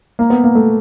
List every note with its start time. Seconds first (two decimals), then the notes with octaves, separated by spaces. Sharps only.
0.19 A#3
0.30 B3
0.44 A#3
0.55 A3